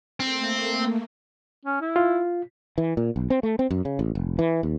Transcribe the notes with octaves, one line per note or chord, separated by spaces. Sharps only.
A3 A#3 C4
C#4
E4
F4
E3
A#2
B1
C4
A3
C4
F#2
C#3
A1
F1
E3
D#2